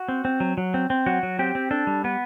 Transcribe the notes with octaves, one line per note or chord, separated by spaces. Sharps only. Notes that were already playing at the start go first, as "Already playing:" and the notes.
Already playing: F#4
C4
C4
F#3
F#3
C4
C4
F#3 F#4
F#3
C4 G4
C4
D4 A4
G3
B3 B4